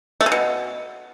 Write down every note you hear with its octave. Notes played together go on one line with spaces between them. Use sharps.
A3
C#3
B2